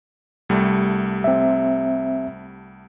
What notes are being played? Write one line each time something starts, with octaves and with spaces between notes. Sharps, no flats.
C2 G3 A3
C4 E5